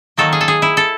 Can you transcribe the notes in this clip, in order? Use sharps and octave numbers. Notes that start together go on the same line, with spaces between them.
D#3 F#3 A#3 A4
G#4
A4
G#4
E4
A4